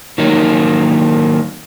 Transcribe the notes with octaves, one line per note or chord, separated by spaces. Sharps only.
D#3 F#3 A#3 D#4